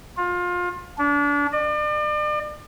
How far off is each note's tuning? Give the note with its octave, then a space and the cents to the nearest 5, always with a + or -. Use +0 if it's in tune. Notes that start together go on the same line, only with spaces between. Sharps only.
F4 +25
D4 -30
D5 +40